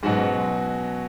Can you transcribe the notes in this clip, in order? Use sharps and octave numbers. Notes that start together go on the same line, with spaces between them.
G#2 B2 F#3 C#4 F#4